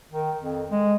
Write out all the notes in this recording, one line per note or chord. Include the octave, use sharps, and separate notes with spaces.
D#3
F2
G#3